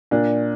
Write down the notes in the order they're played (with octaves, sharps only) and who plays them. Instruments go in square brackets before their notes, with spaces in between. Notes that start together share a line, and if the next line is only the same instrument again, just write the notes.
[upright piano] A#2 D4